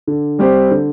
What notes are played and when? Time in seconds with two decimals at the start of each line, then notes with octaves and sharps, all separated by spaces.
0.07 D3
0.39 G3 C4 G4 C5
0.71 D3